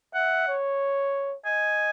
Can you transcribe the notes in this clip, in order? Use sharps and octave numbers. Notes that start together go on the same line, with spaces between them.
E5 F#5
C#5
D#5 G#5